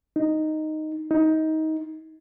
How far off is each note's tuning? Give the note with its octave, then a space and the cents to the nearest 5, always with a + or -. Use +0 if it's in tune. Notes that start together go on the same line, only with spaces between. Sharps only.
D#4 -5
D#4 +20